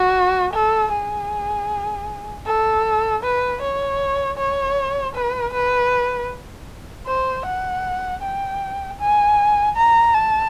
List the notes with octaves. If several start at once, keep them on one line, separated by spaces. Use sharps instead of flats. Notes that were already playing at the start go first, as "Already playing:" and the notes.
Already playing: F#4
A4
G#4
A4
B4
C#5
C#5
B4
B4
C5
F#5
G5
G#5
A#5
A5